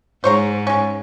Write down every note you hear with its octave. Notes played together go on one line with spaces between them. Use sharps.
G#2 C5 C#5 A#5
G#3 C#4